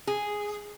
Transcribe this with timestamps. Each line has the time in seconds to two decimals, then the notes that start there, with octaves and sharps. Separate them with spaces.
0.07 G#4